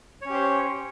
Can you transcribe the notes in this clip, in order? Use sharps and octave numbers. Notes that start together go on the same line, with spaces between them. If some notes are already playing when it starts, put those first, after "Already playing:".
C#4 G4 C5 C#5